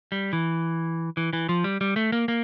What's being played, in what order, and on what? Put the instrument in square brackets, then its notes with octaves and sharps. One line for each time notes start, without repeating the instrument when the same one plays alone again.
[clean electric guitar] G3
E3
E3
E3
F3
G3
G3
A3
A#3
A#3